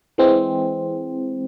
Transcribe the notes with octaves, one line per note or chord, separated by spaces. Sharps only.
E3 G#3 C4